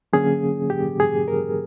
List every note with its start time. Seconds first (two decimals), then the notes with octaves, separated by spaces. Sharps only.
0.13 D3 F#3 A#3 C#4 G#4
0.70 G4
1.00 G#4
1.28 A#4